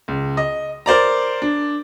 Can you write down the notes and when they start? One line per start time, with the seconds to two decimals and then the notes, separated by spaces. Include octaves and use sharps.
0.08 C#2
0.37 D#5
0.86 A#4 C5 D5 A#5
1.42 D4